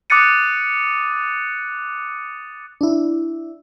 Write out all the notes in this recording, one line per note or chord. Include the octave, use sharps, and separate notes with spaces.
D6 D#6 F#6 A6 C#7 D#7
D4 E4